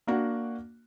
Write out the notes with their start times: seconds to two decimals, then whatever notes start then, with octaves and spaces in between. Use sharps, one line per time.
0.07 A#3 D4 F#4 F#5